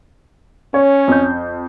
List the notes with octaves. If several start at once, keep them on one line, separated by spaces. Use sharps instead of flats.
C#4 C#5
F2 G6